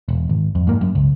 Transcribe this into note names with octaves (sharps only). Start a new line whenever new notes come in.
E1
G#1
F2
G#2 A#3
F#2
C#2